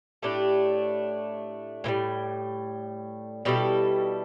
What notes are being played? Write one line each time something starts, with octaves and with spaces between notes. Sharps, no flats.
A2 A3 D4 G4
A2 E3 G3
B2 G3 E4 A4